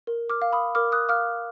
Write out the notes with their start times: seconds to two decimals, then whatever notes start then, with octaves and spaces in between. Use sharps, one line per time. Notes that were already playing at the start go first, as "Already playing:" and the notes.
0.07 A#4
0.30 D6 F6
0.42 F5
0.53 B5 D#6
0.75 A#4 D6 F6
0.92 D#6 F#6
1.09 F5 D6 F6